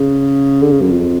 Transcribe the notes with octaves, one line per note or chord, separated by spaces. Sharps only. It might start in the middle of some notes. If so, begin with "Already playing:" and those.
Already playing: C#3
D3
C#3
F#2
F2